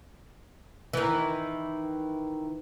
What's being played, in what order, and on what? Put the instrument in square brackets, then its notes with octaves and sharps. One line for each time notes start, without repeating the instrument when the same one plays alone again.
[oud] D#3 E3